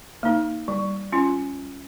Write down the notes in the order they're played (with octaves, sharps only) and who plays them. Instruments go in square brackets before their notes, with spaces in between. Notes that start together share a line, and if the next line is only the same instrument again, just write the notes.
[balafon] A#3 D#4
G3
C#4 F4